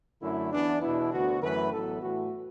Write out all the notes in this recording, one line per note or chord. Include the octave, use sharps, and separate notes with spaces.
F#2 D3 A3 E4
E2 E3 B3 D4
E2 B2 B3 E4
D2 D3 B3 F#4
F#2 E3 A3 B4
A1 A2 F#3 B3 A4
A2 E3 A3 F#4